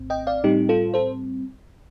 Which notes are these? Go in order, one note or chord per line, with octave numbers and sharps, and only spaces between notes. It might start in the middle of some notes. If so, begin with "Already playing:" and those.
Already playing: A#1 A2 C4
D#5 G5
D5 F5
A2 G3 C4 D#4 G4
F4 A4
A4 C5